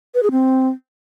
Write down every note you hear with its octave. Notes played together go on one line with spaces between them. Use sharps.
B4
G#4
C4